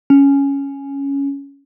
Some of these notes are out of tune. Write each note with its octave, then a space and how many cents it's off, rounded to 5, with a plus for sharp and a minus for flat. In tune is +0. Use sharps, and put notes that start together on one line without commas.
C#4 +5